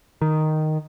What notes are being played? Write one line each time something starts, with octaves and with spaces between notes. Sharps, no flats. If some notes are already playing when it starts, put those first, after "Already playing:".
D#3